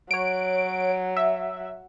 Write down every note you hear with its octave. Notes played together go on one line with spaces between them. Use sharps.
F#3 C#5 D7
E5